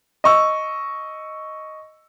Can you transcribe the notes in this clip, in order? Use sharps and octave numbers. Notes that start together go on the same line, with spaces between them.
D#5 C#6 E6